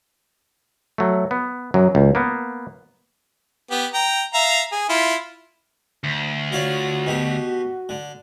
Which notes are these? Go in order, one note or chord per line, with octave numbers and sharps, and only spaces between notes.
F#3 A3
B3
F#2 F#3
C#2
A#3 B3
B3 G4
G5 A#5
E5 F5 A#5
G#4
E4 F4
D2
F4 F#4 C#5 D5
B2 G4
D3